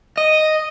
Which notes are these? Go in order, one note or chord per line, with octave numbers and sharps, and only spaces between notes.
D#5